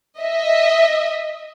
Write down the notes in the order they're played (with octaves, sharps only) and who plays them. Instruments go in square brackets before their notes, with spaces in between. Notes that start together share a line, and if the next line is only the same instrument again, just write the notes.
[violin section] D#5 E5